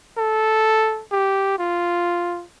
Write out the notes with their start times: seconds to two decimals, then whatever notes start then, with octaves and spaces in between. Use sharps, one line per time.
0.18 A4
1.12 G4
1.59 F4